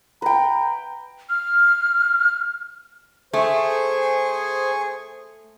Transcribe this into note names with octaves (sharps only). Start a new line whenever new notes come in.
B4 G5 A#5
F6
A3 G#4 C5 G#5 C#6